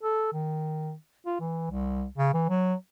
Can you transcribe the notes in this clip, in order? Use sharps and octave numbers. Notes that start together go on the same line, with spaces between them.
A4
D#3
F4
E3
C2
C#3
E3
F#3